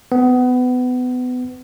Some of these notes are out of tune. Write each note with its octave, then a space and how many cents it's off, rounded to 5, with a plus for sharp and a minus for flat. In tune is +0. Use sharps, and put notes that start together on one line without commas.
B3 +25